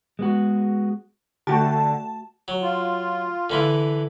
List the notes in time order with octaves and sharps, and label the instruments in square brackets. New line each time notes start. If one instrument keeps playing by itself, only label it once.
[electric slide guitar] G#3 B3 F#4
[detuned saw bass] D3 [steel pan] A3 F#4 G4 [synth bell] A5
[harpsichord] F#3
[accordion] F4
[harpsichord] D3 E3 E4